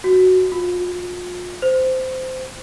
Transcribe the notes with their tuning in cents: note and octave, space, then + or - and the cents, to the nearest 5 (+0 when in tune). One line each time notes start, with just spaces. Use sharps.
F#4 +0
F4 +35
C5 -15